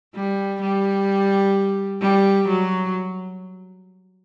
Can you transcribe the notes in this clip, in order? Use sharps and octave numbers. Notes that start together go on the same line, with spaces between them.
G3
G3
G3
F#3